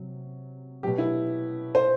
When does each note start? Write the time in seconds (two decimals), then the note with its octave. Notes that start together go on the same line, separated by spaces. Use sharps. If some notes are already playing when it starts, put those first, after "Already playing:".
Already playing: C3 F#3
0.83 F#3 G4
0.87 B2
0.98 E4
1.75 C5